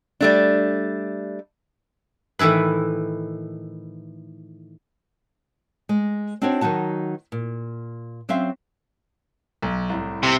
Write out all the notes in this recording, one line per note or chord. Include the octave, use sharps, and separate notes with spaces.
G3 A3 D4
A2 D#3 E3 E4 B4
G#3
C4 D4 D#4 F#4 C5 C#5
D#3 F#3 D#4 F#4 A5
A#2
F#3 C4 C#4 C5 E5 F5
B1
C2 A2
C3